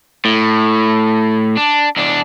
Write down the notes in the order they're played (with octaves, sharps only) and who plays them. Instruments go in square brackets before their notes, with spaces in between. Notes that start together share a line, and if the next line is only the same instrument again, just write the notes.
[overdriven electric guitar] A2
D4
E2 D4